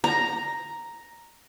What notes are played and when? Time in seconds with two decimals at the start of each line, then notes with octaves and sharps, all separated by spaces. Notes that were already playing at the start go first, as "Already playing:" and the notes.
0.04 A#5